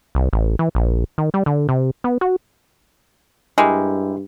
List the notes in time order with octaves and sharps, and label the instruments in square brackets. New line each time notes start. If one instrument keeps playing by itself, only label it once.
[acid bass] C2
A1
E3
A#1
D#3
G3
D3
C3
B3
F#4
[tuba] G2 [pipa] G#3 [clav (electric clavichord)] E4 G4 A#4